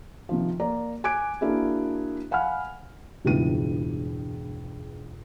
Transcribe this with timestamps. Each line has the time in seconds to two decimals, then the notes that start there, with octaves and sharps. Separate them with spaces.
0.29 C3 D#3 F3
0.60 A#3 D5 A#5
1.04 G#5 D6 F#6 G#6 D7
1.41 A#3 D4 E4 F#4 G#4
2.31 F5 F#5 G#5 B5 F6
3.24 E1 C#2 G2 E4 D#7